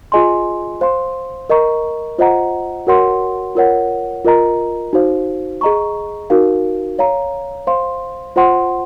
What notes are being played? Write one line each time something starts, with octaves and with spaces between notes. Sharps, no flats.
F4 G#4 D#5 G#5 C6
C5 F5 C6
A#4 D#5 A#5 C#6
F4 C5 D#5 F#5 A#5
F#4 A#4 C#5 F#5 C6
F4 A#4 C#5 F#5
F4 A#4 D#5 A#5
D#4 F#4 C5 F5
G#4 D#5 A#5 C#6
D#4 F#4 A#4 F5
C#5 F5 A#5
C5 F5 C6
F4 C5 F#5 C6